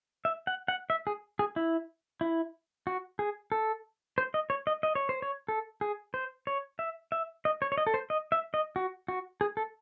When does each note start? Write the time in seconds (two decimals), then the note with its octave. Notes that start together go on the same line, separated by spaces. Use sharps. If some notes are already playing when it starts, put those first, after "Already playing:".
0.25 E5
0.47 F#5
0.68 F#5
0.90 E5
1.07 G#4
1.39 G#4
1.56 E4
2.21 E4
2.87 F#4
3.19 G#4
3.52 A4
4.18 C5
4.34 D#5
4.50 C#5
4.67 D#5
4.83 D#5
4.95 C#5
5.09 C5
5.22 C#5
5.48 A4
5.81 G#4
6.14 C5
6.47 C#5
6.79 E5
7.12 E5
7.45 D#5
7.62 C#5
7.72 C#5
7.78 D#5
7.87 A4
7.94 C5
8.10 D#5
8.32 E5
8.54 D#5
8.76 F#4
9.08 F#4
9.41 G#4
9.57 A4